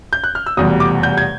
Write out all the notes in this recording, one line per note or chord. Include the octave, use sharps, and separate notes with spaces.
G6
F#6
F6
E6
F1 E2 B2 G3 D#6
D6
G6
G#6